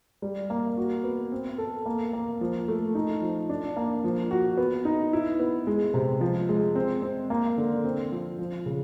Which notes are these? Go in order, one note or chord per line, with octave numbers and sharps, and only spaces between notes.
G3
A#3
F#4
B3
C4
A4
A#3
A#3
F3
A3
D#4
F3
D4
A#3
F3
F#4
B3
D#4
E4
B3
G#3
C3
F3
G#3
C4
C4
A#3
D3
C4
F3
F3
C#3